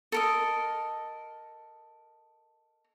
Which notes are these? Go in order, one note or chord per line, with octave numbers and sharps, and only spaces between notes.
A4 A#4 D#5